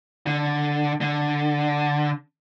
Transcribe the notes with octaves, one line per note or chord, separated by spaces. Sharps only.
D3
D3